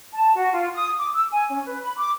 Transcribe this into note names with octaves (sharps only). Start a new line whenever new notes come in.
A5
F#4
F4
D#6
D6
E6
G#5
C#4
B4
B5
D6